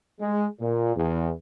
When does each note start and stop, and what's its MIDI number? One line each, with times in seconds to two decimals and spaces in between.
0.20 0.46 56
0.61 0.94 46
0.96 1.31 40